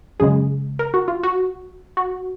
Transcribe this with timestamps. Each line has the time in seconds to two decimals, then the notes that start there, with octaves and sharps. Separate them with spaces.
0.20 F#2 C#3 G#3 G#4
0.79 A#4
0.94 F#4
1.08 F4
1.23 F#4
1.97 F#4